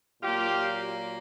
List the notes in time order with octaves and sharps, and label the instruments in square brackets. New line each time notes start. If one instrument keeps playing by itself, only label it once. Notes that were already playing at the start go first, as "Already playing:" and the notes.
[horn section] A#2 F#3 A#3 F4 G4